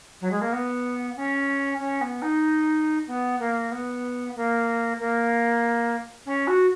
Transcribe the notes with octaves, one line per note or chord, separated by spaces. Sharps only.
F#3
G#3
A#3
B3
C#4
C#4
B3
D#4
B3
A#3
B3
A#3
A#3
C#4
F#4